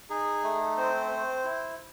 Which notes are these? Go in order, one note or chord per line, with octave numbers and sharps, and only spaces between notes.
D#4 G#4
A3
C4 C5
C4
E4